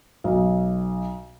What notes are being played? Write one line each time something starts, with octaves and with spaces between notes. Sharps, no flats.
B1